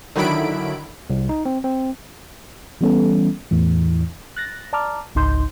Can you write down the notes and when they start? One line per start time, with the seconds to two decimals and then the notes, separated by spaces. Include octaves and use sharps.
0.16 D3 D#3 F#3 E4 B5 D7
1.10 C2
1.29 D#4
1.45 C4
1.64 C4
2.81 E3 G3 B3 C#4 A4
3.51 E2 A2 E3
4.36 F#6 A6 A#6
4.73 D5 A5 A#5 D6 F6
5.15 G#1 C#2 D#4 C6 G6